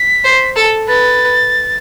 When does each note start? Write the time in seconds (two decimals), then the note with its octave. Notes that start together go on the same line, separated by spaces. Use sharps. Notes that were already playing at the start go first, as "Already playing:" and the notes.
Already playing: B6
0.24 C5
0.56 A4
0.88 B4 A6